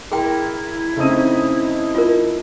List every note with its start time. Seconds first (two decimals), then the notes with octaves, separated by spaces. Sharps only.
0.12 E4 G#4 A#4 G5 C6
0.97 C#3 A3 C4 D#4 D#7
1.95 F4 A#4